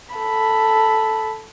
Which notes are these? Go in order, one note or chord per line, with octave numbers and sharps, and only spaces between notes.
A4 B5